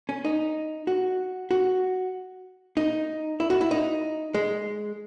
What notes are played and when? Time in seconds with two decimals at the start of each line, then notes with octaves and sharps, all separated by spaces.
0.09 C#4
0.25 D#4
0.87 F#4
1.51 F#4
2.77 D#4
3.40 E4
3.50 F#4
3.61 E4
3.71 D#4
4.34 G#3